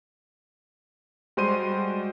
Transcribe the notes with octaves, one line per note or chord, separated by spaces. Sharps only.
G3 G#3 F#4 C5 C6 D#7